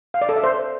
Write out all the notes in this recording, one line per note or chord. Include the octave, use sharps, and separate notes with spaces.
F5
D5
A4
E5
C5